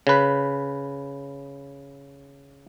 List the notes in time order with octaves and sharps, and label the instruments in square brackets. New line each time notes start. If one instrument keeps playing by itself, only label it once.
[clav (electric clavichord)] C#3 B4